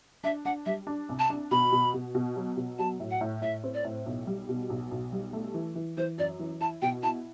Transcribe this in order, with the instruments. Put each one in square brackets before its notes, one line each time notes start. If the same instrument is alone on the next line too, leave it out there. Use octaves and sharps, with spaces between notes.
[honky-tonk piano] D4 [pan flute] E5
[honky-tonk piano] D4 [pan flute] F#5
[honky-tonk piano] G3 [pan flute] E5
[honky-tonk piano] D4
C2
[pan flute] A5
[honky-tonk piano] D4
[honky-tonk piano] B2 [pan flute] B5
[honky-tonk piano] B2
B2
B2
F#3
B2
[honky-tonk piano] F#3 [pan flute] A5
[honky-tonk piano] A2
[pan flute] F#5
[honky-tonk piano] A2
[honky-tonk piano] A2 [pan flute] E5
[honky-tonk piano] C4
[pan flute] D5
[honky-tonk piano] A2
B1
G3
B2
B1
B1
G3
A3
E3
E3
[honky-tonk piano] E3 [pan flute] C5
[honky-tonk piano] F#2 [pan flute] D5
[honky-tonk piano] E3
[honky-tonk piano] E4 [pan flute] A5
[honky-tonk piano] B2 [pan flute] G5
[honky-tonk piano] E4 [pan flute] A5